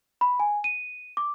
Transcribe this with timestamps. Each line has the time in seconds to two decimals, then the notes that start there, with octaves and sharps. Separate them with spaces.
0.21 B5
0.40 G#5
0.64 D#7
1.17 D6